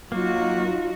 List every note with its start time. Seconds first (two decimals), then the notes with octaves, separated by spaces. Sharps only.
0.12 F#3 A#3 D#4 F4 F#4